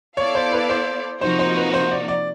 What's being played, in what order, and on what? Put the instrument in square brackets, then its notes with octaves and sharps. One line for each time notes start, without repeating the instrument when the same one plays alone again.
[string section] B3 E4 A4 D5 F5 [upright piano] C#5
[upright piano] C5
B4
C5
[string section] C3 F3 A#3 D#4 F#4 [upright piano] C5
[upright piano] C5
B4
C5
D5
D5